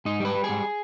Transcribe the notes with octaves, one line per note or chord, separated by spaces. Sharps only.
G#2 D#4
G3 B4
G3
G#4
G#2